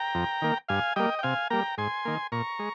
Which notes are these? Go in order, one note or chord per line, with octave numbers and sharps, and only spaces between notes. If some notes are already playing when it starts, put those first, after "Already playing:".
Already playing: G5 A#5
F2
D#3 A#3
G2 F5 G#5
G3 A#3 D#5 G5
G5
C3 F5 G#5
G3 A#3 G5 A#5
G#2 G#5 C6
D#3 A#3
A#2 A#5 C#6
G#3